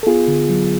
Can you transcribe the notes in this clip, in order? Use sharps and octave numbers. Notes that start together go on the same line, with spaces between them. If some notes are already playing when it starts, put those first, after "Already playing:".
A4
B3 F4 G#4
D3
F#3